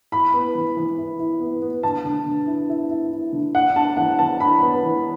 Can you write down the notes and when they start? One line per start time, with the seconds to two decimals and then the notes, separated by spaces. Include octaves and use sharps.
0.12 E4 B5
0.34 B3
0.55 E3
0.77 E3
0.98 E4
1.19 E4
1.40 B3
1.62 B3
1.83 D3 A5
2.05 D3
2.26 D3
2.47 E4
2.69 E4
2.90 E4
3.12 E4
3.33 D3
3.55 D4 F#5
3.76 D4 A5
3.97 E3 F#5
4.19 E3 A5
4.40 D4 B5
4.62 B3
4.83 E3